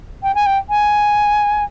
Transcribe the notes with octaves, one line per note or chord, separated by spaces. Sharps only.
G5
G#5
G5
G#5